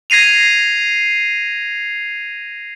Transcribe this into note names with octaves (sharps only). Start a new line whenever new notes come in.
G#6 A#6 C7 D#7 F7